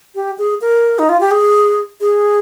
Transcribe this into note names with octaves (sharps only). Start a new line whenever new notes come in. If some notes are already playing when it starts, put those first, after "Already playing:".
G4
G#4
A#4
D#4
F4
G4
G#4
G#4